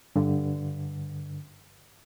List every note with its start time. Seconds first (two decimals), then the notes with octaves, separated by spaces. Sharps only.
0.16 G2 D3